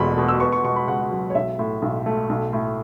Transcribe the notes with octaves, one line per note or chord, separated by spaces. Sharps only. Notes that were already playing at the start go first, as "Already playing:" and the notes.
Already playing: E1 E2 A3 B5 C#6
B2
E6
B3 C#6
C#6
B2 C#6
B5
C#2 F#5
F#3
C#5
B1 E5
A2
B1
A3
B1
A2